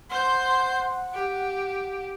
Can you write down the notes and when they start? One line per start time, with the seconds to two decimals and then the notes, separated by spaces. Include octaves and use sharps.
0.10 C5 F#5 C6 G6
1.14 G4